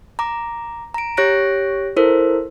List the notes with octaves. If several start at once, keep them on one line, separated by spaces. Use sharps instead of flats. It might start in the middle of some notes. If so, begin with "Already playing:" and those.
A#5 D6
A#5 D7
G4 C#5 F#6 A#6 D7
E4 A4 A#4 C5